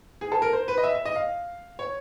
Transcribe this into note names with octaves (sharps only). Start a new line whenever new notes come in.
G#4
A4
A#4
C5
B4
D#5
E5
E5
D#5
F5
C#5